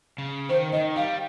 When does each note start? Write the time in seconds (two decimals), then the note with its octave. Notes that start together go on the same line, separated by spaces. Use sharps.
0.18 C#3
0.49 D#3 C5
0.73 D#3 D#5
0.96 G3 F5